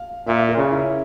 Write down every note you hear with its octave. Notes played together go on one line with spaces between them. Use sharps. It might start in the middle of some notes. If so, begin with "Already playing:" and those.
Already playing: F5
A#2 E5
A#4
C#3
E4